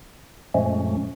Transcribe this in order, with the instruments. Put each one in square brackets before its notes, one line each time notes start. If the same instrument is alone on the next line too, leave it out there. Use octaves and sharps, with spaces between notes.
[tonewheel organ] F#2 A#2 F3 G#3 A3 C#4